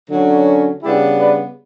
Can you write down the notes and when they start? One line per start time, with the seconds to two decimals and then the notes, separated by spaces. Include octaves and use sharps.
0.09 D3 F#3 C#4
0.83 C#3 G3 B3 D4 E4 G4
1.20 B4 D5